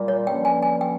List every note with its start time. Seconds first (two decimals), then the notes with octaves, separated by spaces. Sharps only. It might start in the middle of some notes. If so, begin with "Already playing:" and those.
Already playing: A#2 G3
0.08 C#5
0.27 G2 D3 F3 A#3 C#4 G5
0.45 G#5
0.62 G#5
0.81 G5